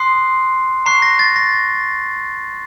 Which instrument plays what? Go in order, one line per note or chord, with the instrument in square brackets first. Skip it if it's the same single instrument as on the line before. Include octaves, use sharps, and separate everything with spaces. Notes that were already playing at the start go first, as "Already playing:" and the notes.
Already playing: [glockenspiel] C6 D#6 F#6 C7
A#5 C#6 F#6 C7
A#6
A6
A#6